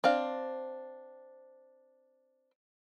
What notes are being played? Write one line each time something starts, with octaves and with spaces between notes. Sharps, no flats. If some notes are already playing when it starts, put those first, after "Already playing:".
C4 D4 F5